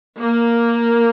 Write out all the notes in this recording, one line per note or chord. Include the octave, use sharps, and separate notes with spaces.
A#3